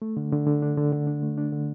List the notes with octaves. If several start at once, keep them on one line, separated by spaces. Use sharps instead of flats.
A3
D3
D3
D3
D4
D3
D3
D4
A3
D4
D3